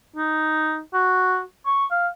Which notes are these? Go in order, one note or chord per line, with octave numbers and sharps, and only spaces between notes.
D#4
F#4
C#6
F5